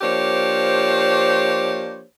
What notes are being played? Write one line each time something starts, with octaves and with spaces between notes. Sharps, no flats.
F3 A#3 D4 G4 C5 C#5